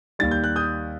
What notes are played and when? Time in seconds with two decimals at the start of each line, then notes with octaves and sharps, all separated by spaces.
0.19 D#2 D#3 G3 A6
0.31 G6
0.44 F#6
0.56 D#6 G6